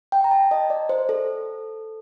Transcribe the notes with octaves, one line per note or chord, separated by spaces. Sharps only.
G5
A#5
A5
D#5
D5
C5
A4